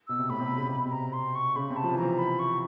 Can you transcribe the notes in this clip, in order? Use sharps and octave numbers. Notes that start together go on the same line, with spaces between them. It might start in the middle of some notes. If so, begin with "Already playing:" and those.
B2 E6
C3
A2 B5
C3
B2
C#3
C3
B2 B5
C3 B5
A#5
C6
C#6
C#3 B5
C3
A5
F3
E3
F3 A#5
B5
C#6